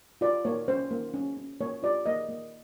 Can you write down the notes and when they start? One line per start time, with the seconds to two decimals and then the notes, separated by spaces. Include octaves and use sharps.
0.21 F4 D5
0.45 A#3 C#5
0.68 C#4 C5
0.91 A#3
1.14 C#4
1.37 C#4
1.61 A#3 C#5
1.83 F4 D5
2.06 A#3 D#5
2.29 A#3